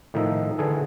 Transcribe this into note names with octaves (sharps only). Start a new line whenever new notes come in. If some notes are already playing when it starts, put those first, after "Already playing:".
A2 D#3 F3 D#4 E5
D3 E3 G#4 A4